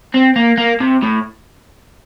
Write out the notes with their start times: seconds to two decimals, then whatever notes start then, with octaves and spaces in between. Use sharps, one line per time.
0.14 C4
0.36 A#3
0.58 A#3
0.81 C3
1.03 A2